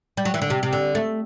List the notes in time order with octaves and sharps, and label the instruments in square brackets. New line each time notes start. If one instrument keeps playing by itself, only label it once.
[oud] G3
F#3
E3
D3
C3
C3
D3
A3